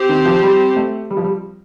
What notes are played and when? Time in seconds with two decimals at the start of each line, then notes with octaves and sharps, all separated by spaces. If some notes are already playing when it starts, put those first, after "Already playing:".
Already playing: C4 G4 C5
0.09 D#3
0.25 F3
0.43 G3
0.76 A3
1.10 G3
1.17 F3
1.24 G3